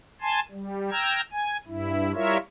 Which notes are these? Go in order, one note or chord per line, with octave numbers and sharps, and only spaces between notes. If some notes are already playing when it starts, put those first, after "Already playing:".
G#5 A5 C6
G3
G5 A#5 E6 F6 G#6
G#5
G2 E4
G3 E4 F4 A#4 C#5 E5